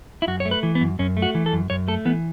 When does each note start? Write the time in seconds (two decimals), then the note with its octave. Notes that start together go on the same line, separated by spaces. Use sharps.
0.22 E4
0.27 F#2 F#4
0.40 C#5
0.45 A3
0.51 B4
0.63 E3
0.75 B3
0.81 F#2
0.99 F#2 C#4
1.17 A3
1.22 F#4
1.35 E3
1.46 A4
1.53 F#2
1.70 F#2 C#5
1.88 A3 A4
2.05 E3 B3